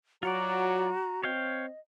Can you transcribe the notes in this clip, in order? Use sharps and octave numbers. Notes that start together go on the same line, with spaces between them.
F#3 F4 F#4 C#5 D5 A#5
C4 C#5 D#5 F5 G5